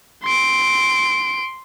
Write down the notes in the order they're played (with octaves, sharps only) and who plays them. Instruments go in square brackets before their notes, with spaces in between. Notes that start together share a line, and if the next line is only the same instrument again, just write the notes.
[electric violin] C6 D7